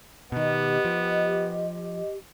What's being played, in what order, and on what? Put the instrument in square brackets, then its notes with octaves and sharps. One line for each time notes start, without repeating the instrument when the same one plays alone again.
[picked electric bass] B2 D#3 [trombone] B3 [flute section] G4 D#5
[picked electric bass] F3